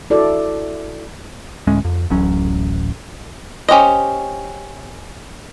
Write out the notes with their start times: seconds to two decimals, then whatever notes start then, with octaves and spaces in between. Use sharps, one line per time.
0.10 E4 F#4 A4 D5
1.67 D2 A2 G#3 C#4
1.85 F2
2.10 D1 A1 F#3 C#4
3.68 C#4 G4 C5 D#5